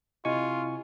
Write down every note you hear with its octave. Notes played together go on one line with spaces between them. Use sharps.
C3 E4 F4 D#5 G#5 C#6